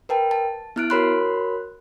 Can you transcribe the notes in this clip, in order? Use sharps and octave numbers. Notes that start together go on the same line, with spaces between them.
A#4 B4 G5 A5
A5
B3 E4 F6 F#6 D7
F#4 A#4 C#5 B5 C6 F#6